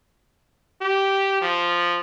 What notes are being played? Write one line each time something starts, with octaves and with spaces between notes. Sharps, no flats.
G4
F3